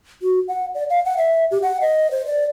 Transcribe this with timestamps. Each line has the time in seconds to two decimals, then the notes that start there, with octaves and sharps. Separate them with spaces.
0.22 F#4
0.48 F#5
0.75 D5
0.90 F5
1.05 F#5
1.17 E5
1.51 G4
1.63 F#5
1.81 D#5
2.11 C5
2.26 D5